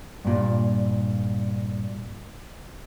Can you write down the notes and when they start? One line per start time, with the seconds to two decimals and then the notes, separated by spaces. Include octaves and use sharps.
0.25 G2 A#2